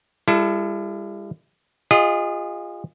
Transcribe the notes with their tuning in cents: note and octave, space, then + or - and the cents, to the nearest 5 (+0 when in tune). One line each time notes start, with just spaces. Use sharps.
G3 +40 E4 +40 A4 +0
F4 +0 G#4 -30 D#5 +0